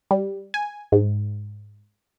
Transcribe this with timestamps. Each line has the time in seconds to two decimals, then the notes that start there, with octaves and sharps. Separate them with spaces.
0.11 G3
0.54 G#5
0.92 G#2